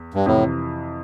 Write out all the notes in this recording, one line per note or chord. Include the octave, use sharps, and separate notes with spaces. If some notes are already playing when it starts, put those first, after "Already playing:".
Already playing: E2
G2
F2 A2 C3 E3